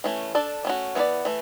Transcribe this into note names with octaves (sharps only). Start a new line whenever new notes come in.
E3 A3 C#4
D4 A4 D5
A3 C#4 F#4
E3 B3 E4 B4 D5
E3 A3